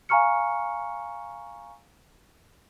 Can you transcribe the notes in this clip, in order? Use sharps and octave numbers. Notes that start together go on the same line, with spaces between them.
F5 G#5 A#5 C#6 F6 C#7